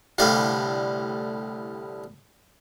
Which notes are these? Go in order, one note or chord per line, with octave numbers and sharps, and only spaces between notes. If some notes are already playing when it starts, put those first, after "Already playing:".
C2 A2 D3 G3 F5